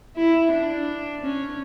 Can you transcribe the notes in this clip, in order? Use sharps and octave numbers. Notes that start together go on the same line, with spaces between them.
E4
D4
C#4